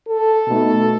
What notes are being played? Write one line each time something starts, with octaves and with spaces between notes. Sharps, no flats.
A4
B2 A3 D#4